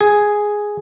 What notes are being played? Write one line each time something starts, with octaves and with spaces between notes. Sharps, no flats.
G#4